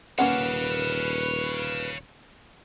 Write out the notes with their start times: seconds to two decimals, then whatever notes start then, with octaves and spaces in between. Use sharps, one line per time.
0.18 D#1 A#3 C#4 B4 C#5 F5 F#5